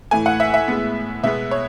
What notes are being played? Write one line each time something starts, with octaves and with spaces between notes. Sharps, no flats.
A2 E3 A3 G#5
F#5
E5
E5
A2 G#3 B3
B2 G#3 B3 E5
C#5